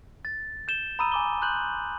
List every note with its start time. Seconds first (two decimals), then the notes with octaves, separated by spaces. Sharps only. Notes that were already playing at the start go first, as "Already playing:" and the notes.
0.25 A6
0.68 G6 E7 G7
0.99 A#5 B5 D#6 E6 D#7
1.12 G#5 D6 G7
1.41 C6 F#6 G6 F#7